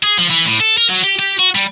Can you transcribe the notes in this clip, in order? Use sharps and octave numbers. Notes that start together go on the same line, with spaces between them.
G#4
F3
E3
A2
A4
A#4
F#3
G4
G4
F#4
G3